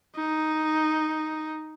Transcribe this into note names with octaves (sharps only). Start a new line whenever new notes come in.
D#4